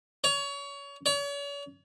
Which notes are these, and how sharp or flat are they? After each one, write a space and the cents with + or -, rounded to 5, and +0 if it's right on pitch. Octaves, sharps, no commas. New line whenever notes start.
C#5 +25
C#5 +40